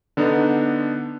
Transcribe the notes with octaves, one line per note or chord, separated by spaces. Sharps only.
D3 B3 D4 D#4